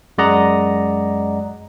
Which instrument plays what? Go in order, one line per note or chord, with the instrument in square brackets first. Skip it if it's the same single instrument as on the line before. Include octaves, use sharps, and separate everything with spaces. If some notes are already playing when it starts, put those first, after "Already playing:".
[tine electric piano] F#2 G#3 D5 D#5 F#5 A#5